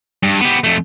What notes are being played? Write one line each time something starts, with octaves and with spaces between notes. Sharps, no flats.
G2
B3 G4
F2 A3